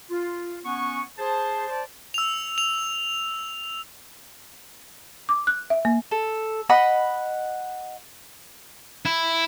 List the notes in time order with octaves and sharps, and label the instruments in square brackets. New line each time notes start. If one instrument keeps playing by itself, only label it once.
[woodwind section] F4
B3 C#4 F#5 G#5 C#6
G#4 C5 A5
C5 D5 A5
[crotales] E6 F7
F7
[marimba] D6
F#6
E5
A#3
[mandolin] A4
D#5 F#5 B5 D#6
[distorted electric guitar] E4